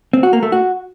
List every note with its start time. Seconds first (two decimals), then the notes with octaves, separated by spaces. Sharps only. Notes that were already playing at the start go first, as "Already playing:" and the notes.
0.13 C4
0.23 F#4
0.33 A#3
0.43 A3
0.52 F#4